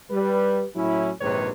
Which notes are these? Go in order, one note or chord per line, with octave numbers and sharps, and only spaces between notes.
G3 B4
A2 F#3 C#4 E4
A#1 G#2 C3 D#3 B4 C#5